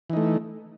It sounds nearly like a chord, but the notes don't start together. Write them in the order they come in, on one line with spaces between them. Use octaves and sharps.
E3 D#4 A3